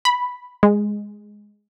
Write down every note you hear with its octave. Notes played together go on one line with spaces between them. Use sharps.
B5
G#3